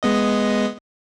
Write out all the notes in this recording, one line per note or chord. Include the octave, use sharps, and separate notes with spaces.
G#3 B3 D#5